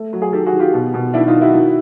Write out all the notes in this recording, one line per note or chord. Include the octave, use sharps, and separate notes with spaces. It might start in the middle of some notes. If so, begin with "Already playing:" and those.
Already playing: A3
F#3
G#4
D#3 G4 A4
F#4 G#4
D#3
F4 G4
B2
B2
D#3 D4 E4
D#4 F4
D#3
E4 F#4
D#3